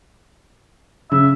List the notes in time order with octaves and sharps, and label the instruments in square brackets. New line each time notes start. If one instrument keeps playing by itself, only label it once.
[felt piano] C#3 [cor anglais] E5